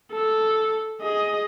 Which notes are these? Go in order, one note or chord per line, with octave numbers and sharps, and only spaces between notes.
A4
G#4 D#5